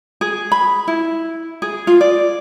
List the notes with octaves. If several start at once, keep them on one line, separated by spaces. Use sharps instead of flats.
G#4
B5
E4
G#4
F4
D5